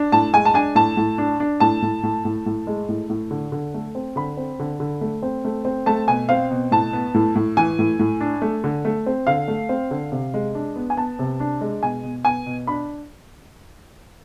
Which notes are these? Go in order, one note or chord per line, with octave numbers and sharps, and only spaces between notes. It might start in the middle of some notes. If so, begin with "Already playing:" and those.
Already playing: D4
A2 A5
G#3 G#5
A5
D4 G#5
A2 A5
A2
D4
D4
A2 A5
A2
A2
A2
A2
G#3
A2
A2
D3
D3
A3
C4
D3 B5
C4
D3
D3
A3
C4
A3
C4
A3 A5
B2 G#5
C4 F5
B2
A2 A5
B3
A2
A2
E3 G#5
A2
A2
D4
A3
D3
A3
C4
D3 F5
A3
C4
D3
C3
G#3
D4
B3
G#5
B3 A5
C3
D4
G#3
B2 G#5
B2
B3 G#5
B2
D4 B5